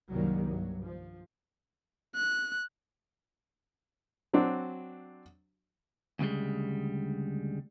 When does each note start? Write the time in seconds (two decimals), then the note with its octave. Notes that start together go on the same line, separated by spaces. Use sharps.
0.11 C2 F#2 D#3 F#3 G3 A#3
0.49 G2 F#3
0.85 F3
2.15 F#6
4.33 F#3 C4 D4 F#4
6.19 D2 C#3 E3 G3 G#3